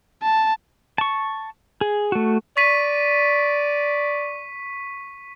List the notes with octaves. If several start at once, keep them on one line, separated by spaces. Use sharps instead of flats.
A5
A5 C#6
G#4
A3 F#4
D5 C#6 B6 D#7